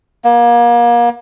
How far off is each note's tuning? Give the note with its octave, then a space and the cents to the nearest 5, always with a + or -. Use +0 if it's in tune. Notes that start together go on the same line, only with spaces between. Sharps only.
A#3 +30